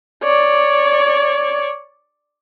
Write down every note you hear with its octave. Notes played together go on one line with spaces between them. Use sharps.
C#5 D5